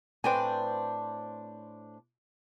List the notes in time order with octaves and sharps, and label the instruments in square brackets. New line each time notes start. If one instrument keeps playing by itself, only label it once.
[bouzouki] A2 D4 C5 [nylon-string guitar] C4 B4 [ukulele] G5 G#5